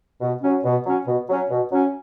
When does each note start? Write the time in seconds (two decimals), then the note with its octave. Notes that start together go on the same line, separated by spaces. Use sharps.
0.21 B2
0.42 F#3 C#4
0.64 B2
0.86 F#3 C#4
1.07 B2
1.29 F#3 C#4
1.50 B2
1.72 F#3 C#4